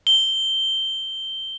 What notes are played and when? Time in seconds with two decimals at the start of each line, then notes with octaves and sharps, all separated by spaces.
0.07 G7